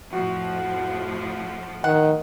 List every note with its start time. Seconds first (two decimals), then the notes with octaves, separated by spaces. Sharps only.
0.12 F2 A2 F3 F#4
1.84 D#3 F#5